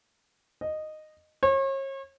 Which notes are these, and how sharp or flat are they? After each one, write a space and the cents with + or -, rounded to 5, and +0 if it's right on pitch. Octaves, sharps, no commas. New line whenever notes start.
D#5 -10
C#5 -40